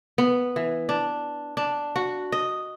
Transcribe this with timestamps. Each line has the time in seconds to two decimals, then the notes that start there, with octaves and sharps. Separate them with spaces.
0.18 B3
0.56 E3
0.89 D4
1.57 D4
1.96 F#4
2.32 D#5